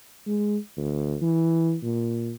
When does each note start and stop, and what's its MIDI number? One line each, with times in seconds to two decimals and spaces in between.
0.27 0.57 56
0.77 1.16 38
1.22 1.76 52
1.83 2.33 46